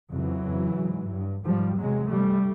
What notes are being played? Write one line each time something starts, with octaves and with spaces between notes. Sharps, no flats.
F2 C#3 E3 F#3
F2 C#3
G#2
G2
G#2 F3 G3
E2 C3 F#3 G#3
G2 G3 A3